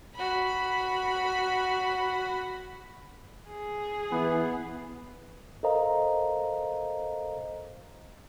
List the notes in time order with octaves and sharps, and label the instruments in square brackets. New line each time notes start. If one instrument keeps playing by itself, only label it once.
[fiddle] F#4 B5
[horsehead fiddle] G#4
[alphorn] E3 [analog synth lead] B3
[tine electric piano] A4 A#4 C5 D#5 F5 A#5